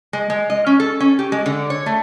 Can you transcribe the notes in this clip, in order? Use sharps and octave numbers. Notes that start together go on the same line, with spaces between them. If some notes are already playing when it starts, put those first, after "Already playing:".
G#3
G#3
D#5
C#4
A4
C#4
G4
G#3
D3
C#5
A3